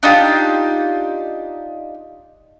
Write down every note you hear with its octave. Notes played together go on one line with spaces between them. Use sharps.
D4 D#4 F4 G4